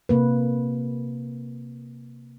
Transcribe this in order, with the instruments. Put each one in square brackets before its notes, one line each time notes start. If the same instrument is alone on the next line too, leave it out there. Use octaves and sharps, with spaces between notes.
[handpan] C3 A#3 B4